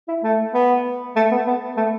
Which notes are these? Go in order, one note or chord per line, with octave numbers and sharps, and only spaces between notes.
E4
A3
B3
A3
B3
B3
A3